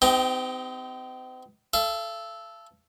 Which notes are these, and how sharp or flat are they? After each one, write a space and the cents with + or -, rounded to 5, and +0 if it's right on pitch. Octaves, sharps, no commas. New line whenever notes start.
C4 -40 D#4 +5 G4 +0
A4 -10 F5 -45